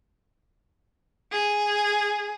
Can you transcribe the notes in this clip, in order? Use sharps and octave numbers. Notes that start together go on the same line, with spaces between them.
G#4